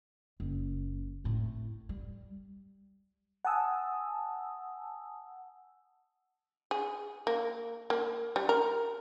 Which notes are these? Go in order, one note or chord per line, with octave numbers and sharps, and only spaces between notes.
F#1
G#1 A2
G3
F#5 G#5 A5 D#6 E6
G#4
A#3
A#3
G3
A#4